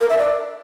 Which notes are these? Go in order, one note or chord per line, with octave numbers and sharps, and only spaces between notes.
A#4
E5
D5